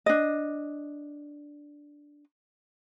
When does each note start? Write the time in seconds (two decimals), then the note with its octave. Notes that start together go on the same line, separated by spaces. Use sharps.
0.06 D4 D#5